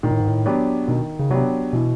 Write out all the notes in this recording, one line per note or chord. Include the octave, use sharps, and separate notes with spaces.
A#2 D#3
A2
G#2
A2
F#3 B3 D4 G4
B2 D#3
C#3
C3 F#3 B3 D4 G4
B2 E3